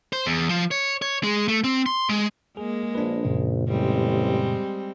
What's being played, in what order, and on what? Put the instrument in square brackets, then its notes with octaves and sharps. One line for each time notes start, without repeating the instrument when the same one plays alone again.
[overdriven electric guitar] C5
E2
F3
C#5
C#5
G#3
A3
C4
C6
G#3
[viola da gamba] G#3 A#3 [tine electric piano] G#4
[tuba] A#1 [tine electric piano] D4 B4
[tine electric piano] F#2 A#2 C#3
[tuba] A1 [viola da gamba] G3 G#3 C4